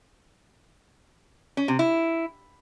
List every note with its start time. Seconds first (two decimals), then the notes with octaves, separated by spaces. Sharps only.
1.57 C#4
1.68 C3
1.79 E4